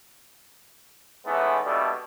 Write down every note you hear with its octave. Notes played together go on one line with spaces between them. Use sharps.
E3 G#3 A3 B3 C#4 D#4
B2 G3 A3 A#3 D4 A4